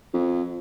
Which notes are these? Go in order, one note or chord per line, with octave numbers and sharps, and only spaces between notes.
F2